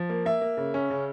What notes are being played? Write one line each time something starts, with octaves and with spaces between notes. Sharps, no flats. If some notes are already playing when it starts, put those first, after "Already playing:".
Already playing: F3
A#3
A#3 E5
A#3
C#3
C#4
C#3